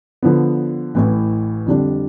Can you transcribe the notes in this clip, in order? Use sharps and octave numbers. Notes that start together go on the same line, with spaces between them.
D3 F3 B3
A1 A2 E3
F2 D3 G3 D4